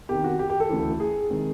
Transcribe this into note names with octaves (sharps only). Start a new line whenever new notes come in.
E2 C3 D#3 G4
F#4
G4
G4
A4
D2 C#3 E3
G#4
C3 D#3 G#3